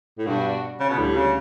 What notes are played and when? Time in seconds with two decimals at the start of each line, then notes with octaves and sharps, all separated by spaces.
0.18 A2
0.26 G2 B2 G3 D4 F#4
0.80 C#3
0.89 B2
0.98 D2 A2 D3 G3
1.16 C#3